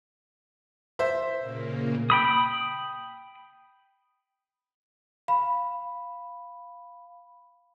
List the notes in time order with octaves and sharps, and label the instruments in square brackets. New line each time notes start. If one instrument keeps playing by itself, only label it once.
[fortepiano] C5 E5
[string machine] A#2 C#3 A#3
[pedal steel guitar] G5 B5 D#6
[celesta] F5 B5